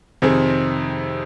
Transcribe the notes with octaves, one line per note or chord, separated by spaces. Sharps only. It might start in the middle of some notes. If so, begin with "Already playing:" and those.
F2 C3 D#3 C4 G#4